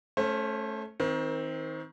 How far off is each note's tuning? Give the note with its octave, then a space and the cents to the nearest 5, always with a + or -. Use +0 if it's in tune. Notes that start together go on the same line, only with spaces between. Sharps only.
A3 -5 C#4 +0 C5 +35
D#3 +30 C4 +0 A#4 +20